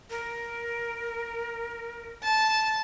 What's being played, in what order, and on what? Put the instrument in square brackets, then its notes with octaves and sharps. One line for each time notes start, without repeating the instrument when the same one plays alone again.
[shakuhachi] A#4
[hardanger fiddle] A5